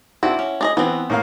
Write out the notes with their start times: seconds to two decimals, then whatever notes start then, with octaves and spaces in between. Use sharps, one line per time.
0.23 C4 D4 E4 F#4
0.39 C#4
0.61 D4 G#4 D#5
0.77 E3 B3 C4
1.10 A2 A#3 F5